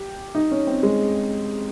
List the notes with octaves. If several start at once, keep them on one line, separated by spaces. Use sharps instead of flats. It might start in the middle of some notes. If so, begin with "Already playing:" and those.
Already playing: G4
D#4
C#4
C4
G#3